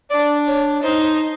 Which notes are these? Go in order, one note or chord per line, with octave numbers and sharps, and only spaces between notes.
D4 D5
C#5
D#4 C5